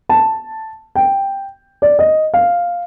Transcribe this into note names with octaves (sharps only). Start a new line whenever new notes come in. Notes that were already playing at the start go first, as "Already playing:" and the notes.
A5
G5
D5
D#5
F5